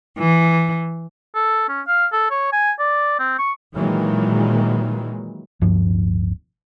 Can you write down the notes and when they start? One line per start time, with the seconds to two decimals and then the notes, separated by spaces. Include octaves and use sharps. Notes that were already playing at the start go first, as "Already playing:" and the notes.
0.19 E3
1.35 A4
1.69 C#4
1.87 F5
2.13 A4
2.31 C#5
2.53 G#5
2.79 D5
3.19 C4
3.39 C#6
3.75 A#2 D#3 E3 F#3 G#3
5.62 D1 G2 F3